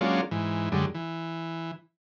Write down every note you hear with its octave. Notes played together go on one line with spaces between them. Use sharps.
F#3 G#3 A#3 C#4 D4 F4
G#2 E3
F#2 D3 G3 G#3
E3